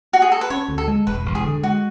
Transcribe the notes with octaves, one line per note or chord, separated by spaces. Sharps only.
F#4
G#4
A4
B4
C#4 C#5
D2
A4
G#3
E1 B4
E1
G#4
D3
G#3 F#4